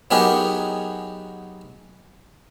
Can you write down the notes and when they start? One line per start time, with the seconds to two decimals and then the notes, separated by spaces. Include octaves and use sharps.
0.11 F#3 B3 D#4 G4 G#4 A#4